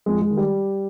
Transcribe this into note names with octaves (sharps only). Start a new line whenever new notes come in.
F2 G#3
G#3
D#3
G3